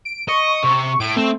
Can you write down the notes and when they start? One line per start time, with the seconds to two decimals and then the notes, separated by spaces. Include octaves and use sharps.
0.05 D7
0.29 D#5 C#6
0.64 C3
1.00 A2 D7
1.16 A3 C4